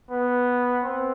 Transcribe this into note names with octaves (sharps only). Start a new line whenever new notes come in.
B3
C4